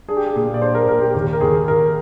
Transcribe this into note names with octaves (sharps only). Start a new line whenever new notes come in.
D4 G#4
G4
G#4
A#2
D5
D4 C5
A#4
A#2 A#4
G4
D#2 G4
A#4
D#2 G#4
D#2 A#4